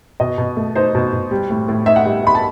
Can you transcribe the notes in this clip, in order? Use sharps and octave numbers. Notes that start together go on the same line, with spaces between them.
B2 D#5
B2
A3
D#4 C5
B2
B2
G3
A2
A2
D#4 E5
F#5
G3 E5
D#4 B5
A5